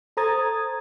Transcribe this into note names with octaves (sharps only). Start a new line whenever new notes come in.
A4 C5 A#5 D#6 G#6 A6